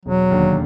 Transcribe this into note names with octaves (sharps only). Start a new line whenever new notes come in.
E1 F#3
D#2 D3